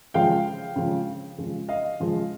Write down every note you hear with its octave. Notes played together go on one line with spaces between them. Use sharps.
C#3 F3 G#3 F5 G5
C#3 F3 G#3
C#3 F3 G#3
D#5 F5
C#3 F3 G#3